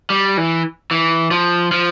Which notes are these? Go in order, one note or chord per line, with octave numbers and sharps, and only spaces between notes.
G3
E3
E3
F3
F3